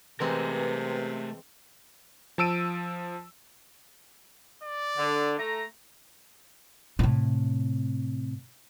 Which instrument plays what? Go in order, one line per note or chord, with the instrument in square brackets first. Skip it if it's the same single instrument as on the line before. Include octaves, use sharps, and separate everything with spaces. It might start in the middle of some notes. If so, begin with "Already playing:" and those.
[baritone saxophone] C3 [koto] E3 G#3 C4 [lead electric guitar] A3 A#4 [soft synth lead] B4
[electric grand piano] F3 A5 E6 D7 D#7
[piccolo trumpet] D5
[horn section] D3
A3 A#5
[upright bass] A2 C3